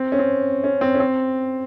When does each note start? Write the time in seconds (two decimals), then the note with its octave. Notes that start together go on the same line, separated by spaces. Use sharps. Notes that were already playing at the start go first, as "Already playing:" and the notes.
Already playing: C4
0.12 C#4
0.19 C4
0.64 C#4
0.81 C4
0.95 C#4
1.00 C4